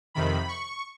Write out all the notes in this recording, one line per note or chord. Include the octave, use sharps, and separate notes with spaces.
F2 C3 D#3 B5
C#6